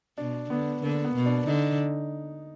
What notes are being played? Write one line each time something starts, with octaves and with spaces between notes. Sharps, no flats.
B2 D4
D3 B3
D3 A#3
B3
B2
D4
D3 D#4